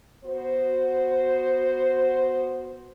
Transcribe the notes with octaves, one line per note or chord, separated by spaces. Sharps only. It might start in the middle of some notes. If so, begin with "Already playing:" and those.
B3 F#4 C5